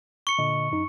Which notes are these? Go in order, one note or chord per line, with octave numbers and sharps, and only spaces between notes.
C#6 C#7
A#2 D3 D#5
F#2 D#4